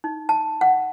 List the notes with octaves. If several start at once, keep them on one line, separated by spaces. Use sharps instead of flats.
D#4
A5
F#5